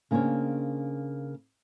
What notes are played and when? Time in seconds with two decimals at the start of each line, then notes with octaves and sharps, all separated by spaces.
0.11 C#3 A#3 C4 D4 C#5